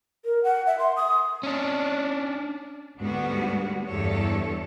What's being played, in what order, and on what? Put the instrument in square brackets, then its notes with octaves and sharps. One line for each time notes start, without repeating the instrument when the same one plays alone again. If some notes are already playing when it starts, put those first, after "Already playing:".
[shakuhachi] A#4
F#5
E5
C6
D#6
[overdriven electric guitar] C#4 D4
[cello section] D2 G#2 D3 G3 B3 F#4
E2 G2 D3 A4 C#5